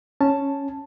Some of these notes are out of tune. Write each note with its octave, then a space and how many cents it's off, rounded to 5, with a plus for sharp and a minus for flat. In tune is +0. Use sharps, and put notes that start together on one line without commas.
C#4 +0 A5 +0